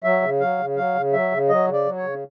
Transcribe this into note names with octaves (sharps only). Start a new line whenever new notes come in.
F#3 E5
C#3
F#3 F5
C#3
F#3 F5
C#3
F#3 E5
C#3
F#3 D#5
C#3
D5
F#3
C#5
C#3